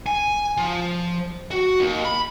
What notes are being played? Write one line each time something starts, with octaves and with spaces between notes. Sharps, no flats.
G#5
F3
F#4
D#2
B5